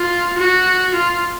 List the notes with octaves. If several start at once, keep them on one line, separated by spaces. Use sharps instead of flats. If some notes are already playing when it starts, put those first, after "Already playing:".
Already playing: F4
F#4
F4